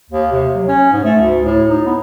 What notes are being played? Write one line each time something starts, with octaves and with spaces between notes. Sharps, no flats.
D#2
C3
F#3
C#4
G#2
A3
D2
A2
D#4
B3